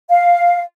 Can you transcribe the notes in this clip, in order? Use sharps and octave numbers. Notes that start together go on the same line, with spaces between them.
F5